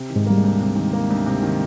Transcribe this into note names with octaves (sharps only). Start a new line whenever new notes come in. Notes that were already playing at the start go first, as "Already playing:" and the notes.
Already playing: C3
D#3
G#2 G#3
G3 A#3
G#2 G#3
D2
C3
D#3
A#3
D2
C3
D#3